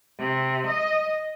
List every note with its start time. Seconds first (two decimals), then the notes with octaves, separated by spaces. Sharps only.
0.19 C3
0.66 D#5